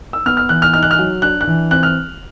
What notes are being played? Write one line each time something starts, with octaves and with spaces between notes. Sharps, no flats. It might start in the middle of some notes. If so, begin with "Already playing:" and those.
E6
B3 F6
F6
E3 F#6
F6
D#4 F6
F#6
F6
F#3
D4 F#6
F#6
E3
C4 F#6
F6